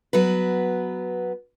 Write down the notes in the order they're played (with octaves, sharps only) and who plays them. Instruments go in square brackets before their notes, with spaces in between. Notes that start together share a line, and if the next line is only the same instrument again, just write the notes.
[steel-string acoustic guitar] F#3 B3 B4